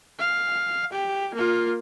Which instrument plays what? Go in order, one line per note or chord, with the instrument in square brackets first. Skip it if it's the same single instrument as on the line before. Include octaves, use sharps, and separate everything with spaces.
[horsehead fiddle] F5
G4
A#3 F4